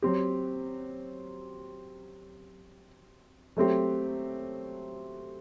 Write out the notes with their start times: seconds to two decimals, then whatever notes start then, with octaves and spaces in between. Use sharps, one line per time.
0.02 F#3 C4 G4
3.57 F#3 A3 C4 G4